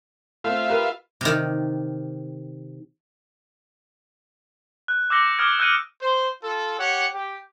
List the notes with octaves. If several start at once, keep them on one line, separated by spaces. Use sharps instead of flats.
A3 C4 F4 E5 F5
G4 A#4 B4
C3 D#3
F#6
D6 E6 G6 A#6 C#7 G7
D6 D#6 F6 G#6 D7
E6 F#6 G6 C#7 D#7
C5
F4 A4
G4 C#5 F#5
G4